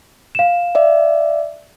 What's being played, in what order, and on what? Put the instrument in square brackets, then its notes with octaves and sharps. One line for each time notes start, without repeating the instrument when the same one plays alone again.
[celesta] F5 E7
[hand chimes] D5 E5